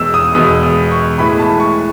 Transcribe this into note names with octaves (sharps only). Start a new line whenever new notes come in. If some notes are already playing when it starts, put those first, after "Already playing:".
Already playing: E2 B2 G#3 E6
D#6
E2 B2 G#3 D#6
D#6
C#6
A2 E3 G#3 B5
A5
C#6